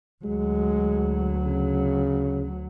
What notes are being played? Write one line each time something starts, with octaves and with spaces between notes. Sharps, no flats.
D2 F#3 G#3
C#3